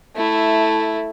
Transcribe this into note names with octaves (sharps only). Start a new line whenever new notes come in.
A3 E4